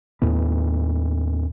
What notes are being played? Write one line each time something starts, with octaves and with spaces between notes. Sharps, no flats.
D#2 A2 B3